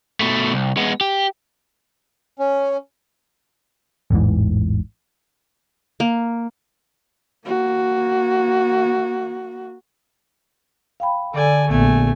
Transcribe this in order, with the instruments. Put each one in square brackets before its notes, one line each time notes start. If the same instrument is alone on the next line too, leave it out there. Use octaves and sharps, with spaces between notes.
[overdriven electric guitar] B2 A3
C2
G#3 B3
G4
[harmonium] C#4
[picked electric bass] A1 E2 G#2 E3
[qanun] A#3
[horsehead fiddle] A#3 F#4
[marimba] F5 G5 B5
[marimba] D3 [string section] A4 [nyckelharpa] D5 G#5
[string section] A#1 [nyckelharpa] A3 G#5 [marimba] B3